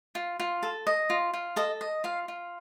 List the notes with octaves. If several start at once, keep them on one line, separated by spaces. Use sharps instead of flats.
F4
F4
A4
D#5
F4
F4
A4 D#5
D#5
F4 F5
F4